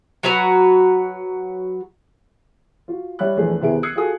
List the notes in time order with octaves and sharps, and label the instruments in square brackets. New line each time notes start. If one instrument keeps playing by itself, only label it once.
[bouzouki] F#3 F#4 B4 A#5
[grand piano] F4 F#4
G3 C#5 E5 B5 F#6
A#1 E2 A3 G#4 B4
D#2 C3 B3 E4 G#4 D7
D#6 E6 F#6 G#6 C7 C#7
F4 F#4 G#4 A4 G#5 D#6